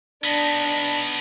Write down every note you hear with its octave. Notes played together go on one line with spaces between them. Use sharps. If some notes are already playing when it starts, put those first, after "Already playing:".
B3 D4 D#4